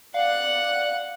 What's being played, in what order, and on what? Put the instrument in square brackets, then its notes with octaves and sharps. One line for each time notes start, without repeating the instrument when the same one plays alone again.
[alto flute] D5 [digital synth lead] F5 [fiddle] F#5 F#6